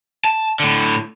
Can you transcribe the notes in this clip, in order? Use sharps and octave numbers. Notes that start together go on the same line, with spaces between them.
A5
A2 D3